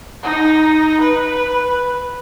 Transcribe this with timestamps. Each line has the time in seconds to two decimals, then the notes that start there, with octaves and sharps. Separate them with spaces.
0.23 D#4
1.01 B4